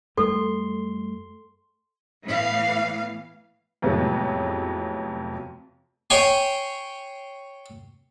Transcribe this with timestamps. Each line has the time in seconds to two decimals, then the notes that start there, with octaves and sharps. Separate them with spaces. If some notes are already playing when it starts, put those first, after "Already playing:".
0.17 F#2 G3 A3 A4 C6
2.24 A2 E3 B3 F5
3.82 F2 A2 C3 F#3 G#3 B3
6.10 C#5 G5 G#5 C6